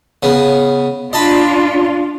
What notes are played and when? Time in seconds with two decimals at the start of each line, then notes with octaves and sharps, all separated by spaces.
0.23 C#3 B3
1.13 D4 F4 D#5 A5 B5